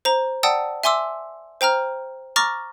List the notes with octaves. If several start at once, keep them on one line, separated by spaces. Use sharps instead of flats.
C5 A#5
D5 F#5 G5 A5 D#6 E6
E5 G#5 C6 D6 E6
C5 G5 A#5 F6
A#5 C#6 D6 F6 A6 A#6